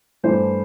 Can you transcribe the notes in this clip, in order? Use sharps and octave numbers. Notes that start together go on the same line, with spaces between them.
G2 E3 A3 E4 C5